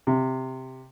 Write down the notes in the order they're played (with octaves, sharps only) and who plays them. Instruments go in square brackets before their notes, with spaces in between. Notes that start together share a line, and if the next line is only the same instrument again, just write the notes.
[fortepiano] C3